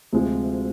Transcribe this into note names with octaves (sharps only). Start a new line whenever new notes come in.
D2 C3 F3 G#3